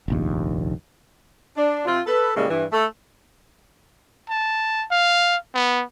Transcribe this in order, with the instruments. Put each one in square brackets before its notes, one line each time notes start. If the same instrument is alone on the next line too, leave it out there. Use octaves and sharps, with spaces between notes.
[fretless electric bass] F1 A#1 D#2
[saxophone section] D4
C3 C4 F4
A4 B4
A2 C#3 G3 G#3 A#3
G2 E3
A3 A4
[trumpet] A5
F5
B3